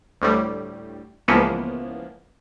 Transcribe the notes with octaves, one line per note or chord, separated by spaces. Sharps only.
D2 A2 G3
C#2 C#3 E3 F3 A#3 B3